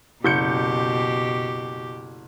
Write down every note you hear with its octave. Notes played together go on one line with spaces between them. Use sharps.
F#1 B2 G4 G6 C#7